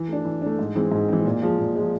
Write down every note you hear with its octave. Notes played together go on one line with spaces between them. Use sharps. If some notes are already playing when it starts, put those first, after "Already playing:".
Already playing: E3
A3 D4
E3
A3 D4
G#2
E3 G#3 C4
G#2
E3 G#3 C4
A#2
F3 G#3
A#2
F3 G#3